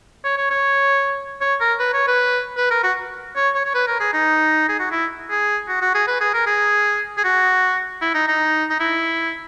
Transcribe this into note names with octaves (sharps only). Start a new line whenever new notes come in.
C#5
C#5
C#5
C#5
A#4
B4
C#5
B4
B4
A#4
F#4
C#5
C#5
C#5
B4
A#4
G#4
D#4
G#4
F#4
E4
G#4
F#4
F#4
G#4
B4
G#4
A#4
G#4
G#4
F#4
E4
D#4
D#4
D#4
E4